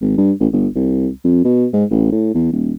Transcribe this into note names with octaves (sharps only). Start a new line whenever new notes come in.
G#1
G2
A1
G1
C2
F2
B2
G#2
A1
A2
E2
D#1